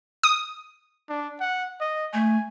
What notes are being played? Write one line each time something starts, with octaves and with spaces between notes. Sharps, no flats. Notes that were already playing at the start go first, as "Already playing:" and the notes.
D#6
D4
F#5
D#5
A3 G#5